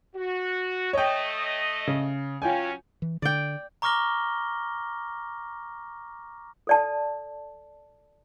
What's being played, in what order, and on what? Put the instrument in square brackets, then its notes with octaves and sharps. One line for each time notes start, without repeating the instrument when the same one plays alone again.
[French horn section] F#4
[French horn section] A3 D#5 [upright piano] C#5 G5
[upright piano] C#3
[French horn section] F#3 C#4 [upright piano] F4 G5 G#5
[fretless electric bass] E3
[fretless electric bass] D3 [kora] D5 G5
[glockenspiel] A#5 C#6 D6 F6 A#6 G7
[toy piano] A4 D5 A5